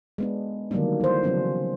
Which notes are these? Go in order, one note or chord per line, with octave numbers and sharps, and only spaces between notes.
G#3 B3 D4
D3 D#3 F#3 G3 A#3 D4
E3 C5
C#3 F3 F#3 B3 C#4 D4